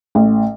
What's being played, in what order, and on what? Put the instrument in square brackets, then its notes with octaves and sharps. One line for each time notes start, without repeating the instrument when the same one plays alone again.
[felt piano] A1